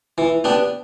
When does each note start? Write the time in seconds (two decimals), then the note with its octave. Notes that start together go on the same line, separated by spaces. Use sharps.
0.18 E3
0.44 B3 D4 G4